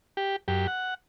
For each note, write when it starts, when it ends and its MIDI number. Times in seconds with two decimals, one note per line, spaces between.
0.17 0.36 67
0.48 0.67 42
0.48 0.67 67
0.67 0.94 78